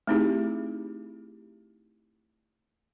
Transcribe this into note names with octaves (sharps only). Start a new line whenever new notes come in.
A3 C4 D#4 E4 G4 G#4